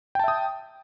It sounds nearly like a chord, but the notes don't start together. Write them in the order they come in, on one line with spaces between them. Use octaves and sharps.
G5 A5 E5 D#6